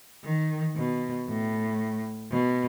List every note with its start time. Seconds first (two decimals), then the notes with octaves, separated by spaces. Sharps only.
0.25 D#3
0.76 B2
1.28 A2
2.31 B2